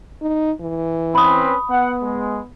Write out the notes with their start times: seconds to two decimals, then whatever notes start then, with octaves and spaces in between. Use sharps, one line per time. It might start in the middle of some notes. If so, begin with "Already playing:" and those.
0.22 D#4
0.61 E3
1.15 C4 C#4 B4 B5 D#6
1.70 B3 F#5
2.03 G#3